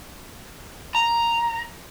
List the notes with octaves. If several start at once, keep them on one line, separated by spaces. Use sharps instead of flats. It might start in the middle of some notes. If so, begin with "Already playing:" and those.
A#5